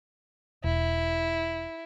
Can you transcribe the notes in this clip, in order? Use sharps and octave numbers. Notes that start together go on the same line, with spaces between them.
E1 E4